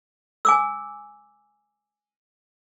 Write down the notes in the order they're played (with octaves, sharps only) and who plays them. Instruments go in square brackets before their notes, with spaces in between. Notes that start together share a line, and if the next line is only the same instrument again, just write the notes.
[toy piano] G#5 D6 E6